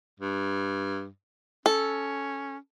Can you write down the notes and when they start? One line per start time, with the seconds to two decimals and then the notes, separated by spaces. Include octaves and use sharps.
0.20 G2
1.66 C#4 A4